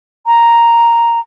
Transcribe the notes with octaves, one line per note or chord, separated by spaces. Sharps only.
A#5